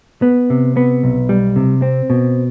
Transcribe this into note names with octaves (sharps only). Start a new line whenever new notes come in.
B3
C3
B3
B1
G3
C3
C4
B2